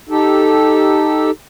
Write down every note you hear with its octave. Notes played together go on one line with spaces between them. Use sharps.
D#4 G4 A4